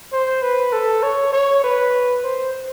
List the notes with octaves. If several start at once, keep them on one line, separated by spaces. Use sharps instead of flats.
C5
B4
A4
C#5
C#5
B4
C5